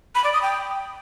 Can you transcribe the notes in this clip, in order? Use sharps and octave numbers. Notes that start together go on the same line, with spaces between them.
B5
D5
D#6
G5